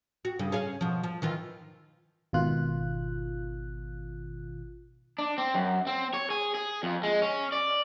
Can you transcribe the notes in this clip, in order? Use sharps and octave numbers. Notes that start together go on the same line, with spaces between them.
F#4
G2 C#3
C#4 G#4 F5
B2 F3
F3
D#3 E3 F4
G#1 B2 D#3 F4 F#6
D4
C4
F#2
C4
C#5
G#4
G#4
F2
G#3
C#4
D5